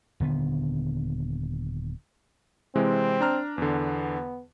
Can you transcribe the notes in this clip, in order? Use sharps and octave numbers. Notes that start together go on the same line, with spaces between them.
D#1 D3 B3
C3 E3 G#3 C4
D4 A#5 F6
E2 D3 B3